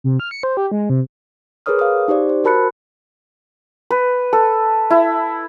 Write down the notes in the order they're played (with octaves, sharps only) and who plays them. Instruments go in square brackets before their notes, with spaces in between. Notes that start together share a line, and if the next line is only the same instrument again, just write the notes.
[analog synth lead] C3
F6
C#7
C5
G4
G#3
C3
[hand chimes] G#4 A#4 B4 C#5 D#6 F6
F5 D#6
D#4 G4 C5 D5
C5
F#4 A#4 A5 B5 F#6 C#7
[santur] B4
A4
E4